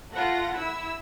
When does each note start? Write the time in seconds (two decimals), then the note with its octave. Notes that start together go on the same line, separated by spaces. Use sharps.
0.13 A3 F4 F#5 A#6
0.56 E4 E6